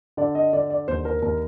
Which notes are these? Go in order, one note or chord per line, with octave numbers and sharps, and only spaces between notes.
D3 D5
D#5
D3 D5
D5
D#2 C5
A#4
D#2 A#4